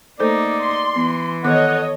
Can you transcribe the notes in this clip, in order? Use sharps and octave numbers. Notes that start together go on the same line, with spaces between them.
A3 A#3 D#4 A4 C5 D5
C6
E3 B3
D#3 B3 A4 C#5 D#5 F#5 D6